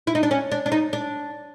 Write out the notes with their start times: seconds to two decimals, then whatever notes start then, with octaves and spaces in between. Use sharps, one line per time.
0.07 E4
0.15 D#4
0.23 D4
0.31 C#4
0.51 D4
0.66 D4
0.72 D#4
0.93 D4